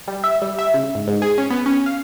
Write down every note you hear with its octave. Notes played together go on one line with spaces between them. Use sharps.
G3
E5
G3
E5
C#3
G#2
G#2
G#4
C#4
B3
C#4
F5